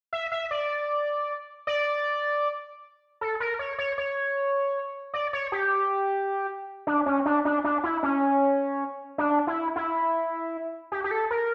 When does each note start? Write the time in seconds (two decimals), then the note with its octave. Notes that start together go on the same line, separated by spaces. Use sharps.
0.13 E5
0.32 E5
0.51 D5
1.67 D5
3.21 A4
3.40 A#4
3.59 C#5
3.78 C#5
3.98 C#5
5.14 D5
5.33 C#5
5.52 G4
6.87 D4
7.06 C#4
7.26 D4
7.45 D4
7.64 D4
7.84 E4
8.03 C#4
9.18 D4
9.47 E4
9.76 E4
10.92 G4
11.04 G4
11.11 A4
11.31 A#4